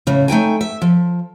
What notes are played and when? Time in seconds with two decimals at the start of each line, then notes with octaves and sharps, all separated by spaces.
0.07 A2 C#3
0.28 A3 D#4 G5 G#5
0.61 E5
0.82 F3